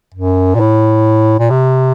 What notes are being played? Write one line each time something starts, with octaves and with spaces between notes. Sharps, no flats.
F#2
A#2
A2
A#2
C3